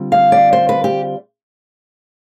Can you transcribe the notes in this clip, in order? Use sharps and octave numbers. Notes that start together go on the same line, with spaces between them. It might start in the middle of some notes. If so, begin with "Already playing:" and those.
Already playing: D3 G3 C4 F4
F5
D5
C5
B4
G4